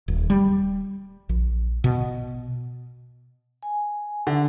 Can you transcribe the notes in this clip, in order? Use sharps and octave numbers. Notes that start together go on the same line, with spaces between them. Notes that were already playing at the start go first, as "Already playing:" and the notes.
D#1
G3
A#1
B2
G#5
D3 E5 A5